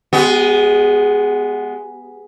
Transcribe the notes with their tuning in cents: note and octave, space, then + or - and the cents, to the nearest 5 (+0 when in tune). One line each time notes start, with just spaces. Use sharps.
G#3 +0 B3 +5 G4 -40